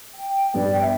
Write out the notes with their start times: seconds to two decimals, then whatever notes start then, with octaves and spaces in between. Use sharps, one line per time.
0.14 G5
0.54 G2 G3 B3 D5
0.75 G5
0.81 E5